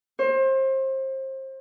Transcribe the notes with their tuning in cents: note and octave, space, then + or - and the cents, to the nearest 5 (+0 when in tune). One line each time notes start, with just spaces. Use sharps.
C5 +30